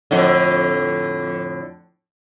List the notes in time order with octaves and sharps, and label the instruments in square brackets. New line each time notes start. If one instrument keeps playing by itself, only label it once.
[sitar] F2 A2 D3